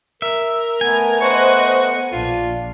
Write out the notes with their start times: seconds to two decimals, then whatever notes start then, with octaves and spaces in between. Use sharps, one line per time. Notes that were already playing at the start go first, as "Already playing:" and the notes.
0.22 A#4 E5
0.81 A3 B3 G#5
1.21 C5 D#5 C#6 F#6
2.12 A#1 D4 F4